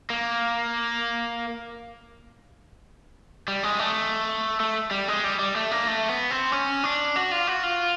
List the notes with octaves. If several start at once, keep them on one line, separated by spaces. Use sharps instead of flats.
A#3
G3
G#3
A3
A3
G3
G#3
G3
G3
A3
A#3
A3
B3
C4
C#4
D4
F#4
F4
F#4
F4